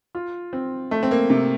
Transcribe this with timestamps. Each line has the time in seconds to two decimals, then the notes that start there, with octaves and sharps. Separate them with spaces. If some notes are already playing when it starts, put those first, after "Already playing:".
0.15 F4
0.53 C4
0.91 A3
1.03 C4
1.11 A#3
1.30 C3